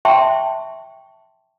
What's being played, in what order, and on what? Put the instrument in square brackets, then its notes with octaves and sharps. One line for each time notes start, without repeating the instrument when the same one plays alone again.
[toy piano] E5 G5 A5 C6 C#6